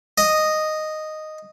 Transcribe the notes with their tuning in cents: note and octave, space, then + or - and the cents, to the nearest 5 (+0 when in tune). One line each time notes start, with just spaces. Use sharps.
D#5 -5